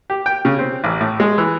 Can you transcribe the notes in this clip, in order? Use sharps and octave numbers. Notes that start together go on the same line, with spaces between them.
G4
G5
C#3
C4
A1
A2
G#3
E3